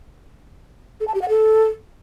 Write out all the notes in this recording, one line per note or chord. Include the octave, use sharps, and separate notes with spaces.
A4
A5
G4
F#5
A4